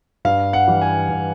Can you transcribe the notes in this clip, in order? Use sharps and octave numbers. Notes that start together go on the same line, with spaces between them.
G2 F5
F#5
E3 G3
G#5
G2